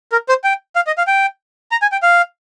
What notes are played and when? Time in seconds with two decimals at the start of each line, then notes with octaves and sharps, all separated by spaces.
0.12 A#4
0.29 C5
0.44 G5
0.76 F5
0.87 D#5
0.98 F5
1.07 G5
1.71 A#5
1.82 G#5
1.92 G5
2.03 F5